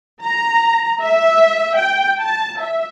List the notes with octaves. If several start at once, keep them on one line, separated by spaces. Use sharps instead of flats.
A#5
E5
G5
A5
E5